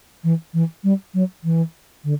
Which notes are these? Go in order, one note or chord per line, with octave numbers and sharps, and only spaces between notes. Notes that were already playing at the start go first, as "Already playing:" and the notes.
E3
E3
G3
F#3
E3
D3